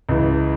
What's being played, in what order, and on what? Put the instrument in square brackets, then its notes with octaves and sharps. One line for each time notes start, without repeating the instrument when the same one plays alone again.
[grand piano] C#2 C#3 E3